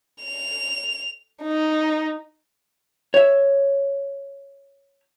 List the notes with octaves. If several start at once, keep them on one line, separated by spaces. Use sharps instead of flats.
F7
D#4
C#5 E5